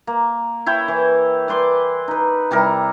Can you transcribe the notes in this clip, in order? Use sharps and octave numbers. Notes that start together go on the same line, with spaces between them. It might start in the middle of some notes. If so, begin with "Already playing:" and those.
A#3
E4 C#5 G5
E3
B4 D5 C6 D6
D#4 B4
C3 G3 E4 A#4